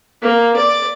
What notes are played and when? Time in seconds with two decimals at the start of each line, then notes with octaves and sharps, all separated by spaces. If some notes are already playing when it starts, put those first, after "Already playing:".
0.22 A#3
0.57 D5